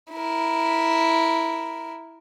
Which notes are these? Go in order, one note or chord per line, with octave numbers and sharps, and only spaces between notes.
E4 A#4